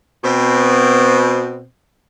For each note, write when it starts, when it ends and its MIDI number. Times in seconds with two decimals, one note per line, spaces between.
0.24 1.66 47
0.24 1.66 60